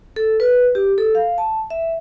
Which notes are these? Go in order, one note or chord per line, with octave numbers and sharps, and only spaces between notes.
A4
B4
G4
A4
F5
A5
E5